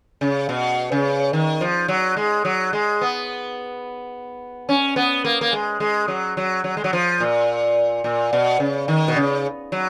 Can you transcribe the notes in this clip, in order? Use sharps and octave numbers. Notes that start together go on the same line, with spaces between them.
C#3
B2
C#3
D#3
F3
F#3
G#3
F#3
G#3
B3
C#4
B3
A#3
A#3
G#3
G#3
F#3
F#3
F#3
G#3
F#3
F3
A#2
A#2
B2
C#3
D#3
B2
C#3
F#3